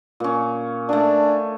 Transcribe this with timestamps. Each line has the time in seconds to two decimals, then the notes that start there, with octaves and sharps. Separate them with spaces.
0.20 A#2 C#4
0.89 A3 D4 G#5